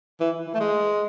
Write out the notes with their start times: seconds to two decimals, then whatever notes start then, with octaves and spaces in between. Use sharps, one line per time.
0.20 E3
0.47 E3
0.54 A3
0.60 G#3